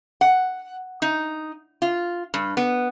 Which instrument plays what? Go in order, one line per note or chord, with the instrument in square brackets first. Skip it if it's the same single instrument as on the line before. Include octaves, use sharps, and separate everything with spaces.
[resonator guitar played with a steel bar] F#5
D#4
F4
G2
B3